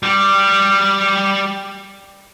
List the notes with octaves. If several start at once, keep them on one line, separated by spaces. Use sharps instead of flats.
G3 G4